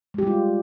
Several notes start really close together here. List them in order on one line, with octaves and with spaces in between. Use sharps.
G#3 G4 G3 F4